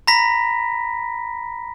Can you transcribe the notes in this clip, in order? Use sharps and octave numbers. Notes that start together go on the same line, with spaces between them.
A#5 B5 A#6 B6